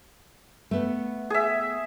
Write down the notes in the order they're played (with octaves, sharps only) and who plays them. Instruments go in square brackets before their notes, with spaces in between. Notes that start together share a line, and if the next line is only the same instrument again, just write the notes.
[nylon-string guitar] A3 B3
[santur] G#4 E5